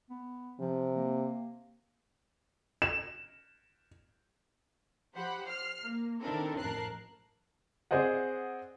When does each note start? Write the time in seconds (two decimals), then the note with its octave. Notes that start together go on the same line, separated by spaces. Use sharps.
0.10 B3
0.60 C3 F3
0.96 A#3
2.82 E7
5.16 F3 G4 C5 F#5 B5
5.47 F6 C7
5.84 A#3
6.21 D#3 C4 D4 E4 A4 A#4
6.59 A1 F2 A#4 A5 F#6 C7
7.91 C4 G#4 C5 D5 D#5 F#5